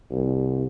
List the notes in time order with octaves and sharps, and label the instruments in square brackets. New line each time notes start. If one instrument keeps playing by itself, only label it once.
[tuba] C2